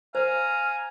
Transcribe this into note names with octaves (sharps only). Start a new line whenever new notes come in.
C5 F5 G#5 A#5